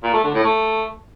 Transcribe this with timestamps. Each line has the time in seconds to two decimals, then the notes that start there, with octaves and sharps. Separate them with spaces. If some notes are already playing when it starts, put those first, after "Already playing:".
0.03 A#2
0.14 A3
0.24 D3
0.34 A2
0.44 A3